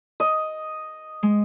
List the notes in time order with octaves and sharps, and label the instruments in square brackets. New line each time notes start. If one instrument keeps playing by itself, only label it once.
[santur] D#5
[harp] G#3